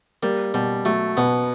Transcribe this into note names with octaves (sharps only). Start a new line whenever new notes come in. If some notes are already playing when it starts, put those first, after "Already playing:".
G3 A#3
B2 G3
F#3 A3
B2 B3